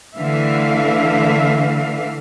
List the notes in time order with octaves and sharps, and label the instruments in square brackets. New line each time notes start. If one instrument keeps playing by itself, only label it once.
[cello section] D3 E3 A3 E5 F5